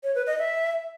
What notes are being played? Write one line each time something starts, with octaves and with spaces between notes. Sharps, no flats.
C#5
B4
D#5
E5